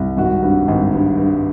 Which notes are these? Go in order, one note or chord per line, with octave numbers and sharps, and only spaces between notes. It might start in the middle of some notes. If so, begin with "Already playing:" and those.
Already playing: C2
G#1 F#4
G2
G#1
G2
G2